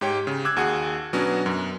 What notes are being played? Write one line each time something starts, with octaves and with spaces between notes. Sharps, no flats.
G#2 G4 C#5 G5
C#3
D6 E6 F#6 G#6
D#2 F#4 G#4 F#5
B2 F#3 B3 C#4 D4 F#4
F#2